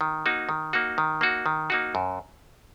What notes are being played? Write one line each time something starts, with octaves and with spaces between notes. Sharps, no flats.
D#3
A#3 D#4 F#4
D#3
A#3 D#4 F#4
D#3
A#3 D#4 F#4
D#3
A#3 D#4 F#4
F#2